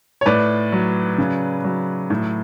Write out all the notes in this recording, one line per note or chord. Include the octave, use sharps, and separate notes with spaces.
C#5
A2 B4 D5
F#3
C#3
F#3
A2